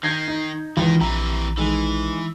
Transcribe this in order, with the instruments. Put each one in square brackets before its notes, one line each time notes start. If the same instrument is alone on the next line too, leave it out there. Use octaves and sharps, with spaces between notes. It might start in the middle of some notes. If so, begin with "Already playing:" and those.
[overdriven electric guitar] D#3 [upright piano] G6 G#6 A#6 [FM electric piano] C7
[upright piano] D#4
[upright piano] C#2 [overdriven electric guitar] D#3 [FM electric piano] E3 F4
[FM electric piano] A#1 [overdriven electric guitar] C3 E3 [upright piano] A#5
[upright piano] D#3 G#3 [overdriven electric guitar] E3